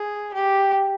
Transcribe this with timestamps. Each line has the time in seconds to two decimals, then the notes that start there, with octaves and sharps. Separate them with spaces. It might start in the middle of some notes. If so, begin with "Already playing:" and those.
Already playing: G#4
0.34 G4